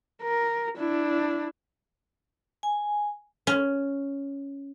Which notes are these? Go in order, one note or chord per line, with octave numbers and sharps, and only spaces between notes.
A#4
D4 E4
G#5
C#4